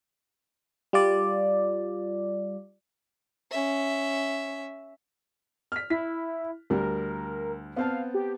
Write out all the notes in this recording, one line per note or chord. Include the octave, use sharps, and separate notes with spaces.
G3 F4 D5
C#4 E5
F6 B6
E4 B6
D2 G3 A#4
B3 C4 F5 A5
G4